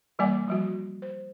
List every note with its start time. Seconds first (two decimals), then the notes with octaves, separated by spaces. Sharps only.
0.19 E3 G3 A#3 D5 G#5 D6
0.48 F3 G3 F#4
1.02 C5